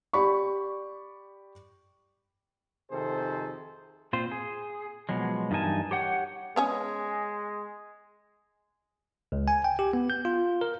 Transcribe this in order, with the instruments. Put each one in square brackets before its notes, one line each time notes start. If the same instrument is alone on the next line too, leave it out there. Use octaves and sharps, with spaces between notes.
[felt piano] G4 D5 B5 C#6
[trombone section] F2 C3 D#3 G#4 A4 C5
[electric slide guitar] A#2 C4 F4 C5
G#4
B2 F3 F#3 G#3
G2 E3 D#4 A#4 G#5 A5
G4 C#5 F#5 G5
[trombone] G#3 [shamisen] B3 C#4 G#4
[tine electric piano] C#2
G#5
G5
G4
B3
G6
F4
A#4